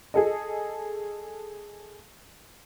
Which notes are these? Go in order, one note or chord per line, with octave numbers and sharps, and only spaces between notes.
G#4 A4 D#5